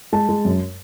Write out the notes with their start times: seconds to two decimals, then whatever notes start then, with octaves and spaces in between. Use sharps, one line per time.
0.13 G#3 A5
0.29 G#3
0.45 F#2